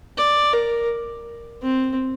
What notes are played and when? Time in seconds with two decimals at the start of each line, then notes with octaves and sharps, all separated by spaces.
0.18 D5
0.53 A#4
1.62 C4